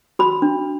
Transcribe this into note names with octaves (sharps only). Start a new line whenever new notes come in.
F#4 B5
D4